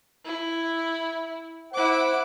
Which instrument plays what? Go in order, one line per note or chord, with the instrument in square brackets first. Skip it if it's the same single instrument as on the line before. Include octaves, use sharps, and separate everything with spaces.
[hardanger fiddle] E4
[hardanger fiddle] E4 D6 [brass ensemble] C5 F#5